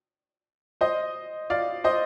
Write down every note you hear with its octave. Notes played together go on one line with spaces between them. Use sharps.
C5 D#5
D5 F5
C5 D#5